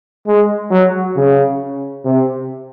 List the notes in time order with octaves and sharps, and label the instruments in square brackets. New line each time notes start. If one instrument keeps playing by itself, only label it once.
[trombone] G#3
F#3
C#3
C3